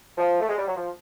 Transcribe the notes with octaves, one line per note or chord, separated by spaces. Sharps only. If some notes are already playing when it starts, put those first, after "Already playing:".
F3
A3
G#3
G3
F#3
F3